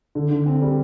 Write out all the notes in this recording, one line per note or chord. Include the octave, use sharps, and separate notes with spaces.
D3
D3
C4
G3